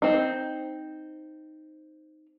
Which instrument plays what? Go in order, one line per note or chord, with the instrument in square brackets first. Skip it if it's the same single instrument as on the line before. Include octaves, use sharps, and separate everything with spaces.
[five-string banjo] C4 D#4